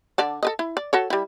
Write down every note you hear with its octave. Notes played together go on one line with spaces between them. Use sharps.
D3 D5 A5
A4 B4 D#5
E4
D5
F#4 A4 C#5
G3 E4